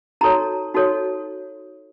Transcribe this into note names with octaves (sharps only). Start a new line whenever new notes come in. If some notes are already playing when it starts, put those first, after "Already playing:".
D#4 F#4 A4 C#5 A#5
D#4 F#4 A4 C#5